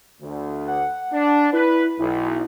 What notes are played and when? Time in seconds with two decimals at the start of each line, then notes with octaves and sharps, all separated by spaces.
0.21 D2
0.68 F#5
1.12 D4
1.53 E4 B4
1.99 B1 E4